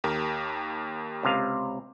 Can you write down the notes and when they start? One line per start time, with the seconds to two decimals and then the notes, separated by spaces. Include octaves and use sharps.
0.04 D#2 G4 A#4
1.23 C#2 C3 F5